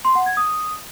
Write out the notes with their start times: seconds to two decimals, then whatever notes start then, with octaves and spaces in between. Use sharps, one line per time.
0.05 C6
0.15 F#5
0.26 G#6
0.37 D#6